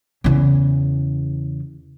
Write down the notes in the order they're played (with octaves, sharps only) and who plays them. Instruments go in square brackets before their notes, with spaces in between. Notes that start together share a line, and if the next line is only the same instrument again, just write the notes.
[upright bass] E2 C#3